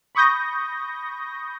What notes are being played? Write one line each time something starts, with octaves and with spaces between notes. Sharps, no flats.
B5 C#6 D#6 G6 A#6